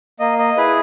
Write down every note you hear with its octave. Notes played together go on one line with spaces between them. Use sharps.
A#3 D#5
D#5
E4 G#4 B4